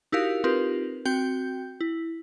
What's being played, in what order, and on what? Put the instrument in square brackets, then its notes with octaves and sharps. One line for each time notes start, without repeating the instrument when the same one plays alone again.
[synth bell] D#4 E4 F#4 G4 A#4 F5
C4 D#4 F4 G4 A#4 B4
C4 F#4 G5 G6
E4